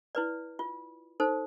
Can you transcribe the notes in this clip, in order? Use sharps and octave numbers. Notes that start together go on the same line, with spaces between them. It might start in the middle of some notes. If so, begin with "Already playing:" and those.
E4 B4 D5
F4
D#4 A4 C5